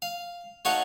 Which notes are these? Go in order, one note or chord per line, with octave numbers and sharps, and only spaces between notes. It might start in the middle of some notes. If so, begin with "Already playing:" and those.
F5
A3 D#4 F#4 C#5 F5 F#5